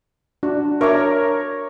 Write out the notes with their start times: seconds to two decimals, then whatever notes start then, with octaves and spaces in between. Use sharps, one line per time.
0.43 D4 F#4
0.81 D4 A#4 C#5 E5 A#5 D6